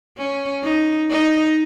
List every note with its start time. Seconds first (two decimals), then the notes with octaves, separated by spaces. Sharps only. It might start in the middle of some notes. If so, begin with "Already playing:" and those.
0.18 C#4
0.64 D#4
1.10 D#4